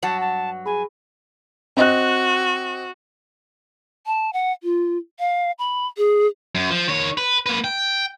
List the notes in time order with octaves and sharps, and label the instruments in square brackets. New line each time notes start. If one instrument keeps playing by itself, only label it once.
[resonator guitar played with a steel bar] G2 F#3 F#5 [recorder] A5
[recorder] A5
[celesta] G#4 B5 [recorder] G#5
[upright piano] C4 D#5 F#6 [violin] F#4
[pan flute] A5
F#5
F4
F5
B5
G#4
[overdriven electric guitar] F#2
F3
D#3 C#5
B4
A#3 B4
G5